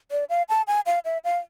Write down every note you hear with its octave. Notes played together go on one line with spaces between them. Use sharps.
D5
F5
A5
G#5
F5
E5
F5